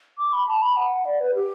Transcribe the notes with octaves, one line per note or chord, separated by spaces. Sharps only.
D6
B5
A5
B5
F#5
D5
B4
G4